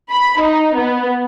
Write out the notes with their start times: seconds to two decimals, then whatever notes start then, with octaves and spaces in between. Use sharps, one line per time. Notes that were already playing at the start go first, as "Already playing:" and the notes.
0.11 B5
0.40 D#4
0.76 B3